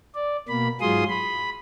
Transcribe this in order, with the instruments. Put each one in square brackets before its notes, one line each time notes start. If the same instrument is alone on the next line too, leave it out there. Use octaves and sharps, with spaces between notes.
[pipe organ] D5
B2 A#3 B5
G#2 F#3 F4 G#4 C6 D#6
B5